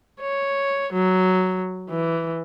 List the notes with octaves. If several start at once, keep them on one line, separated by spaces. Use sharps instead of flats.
C#5
F#3
E3